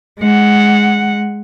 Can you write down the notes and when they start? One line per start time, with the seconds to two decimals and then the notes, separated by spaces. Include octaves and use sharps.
0.20 G#3 F#5